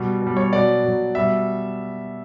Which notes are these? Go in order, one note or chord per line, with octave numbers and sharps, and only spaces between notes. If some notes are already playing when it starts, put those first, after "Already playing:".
Already playing: B2 G3
B2
G3
C#5
B2 F#3 D5
B2 F#3
B2 G3 E5